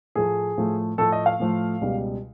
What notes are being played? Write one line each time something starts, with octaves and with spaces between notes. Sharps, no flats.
A2 F3 A3 G#4
A2 F3 A3
A2 F3 A3 A4
D#5
F5
A2 F3 A3
C#2 B2 G3